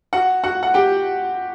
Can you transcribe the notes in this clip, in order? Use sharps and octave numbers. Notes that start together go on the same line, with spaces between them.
F#4 F#5
F#4 F#5
F#5
G4 G5